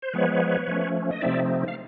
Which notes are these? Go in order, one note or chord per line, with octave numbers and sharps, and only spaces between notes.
C5
F3 G#3 B3 B4 C#5
F3 A3 C#4
D#5
C3 F3 A3 C4 D#4 D5 E5
F5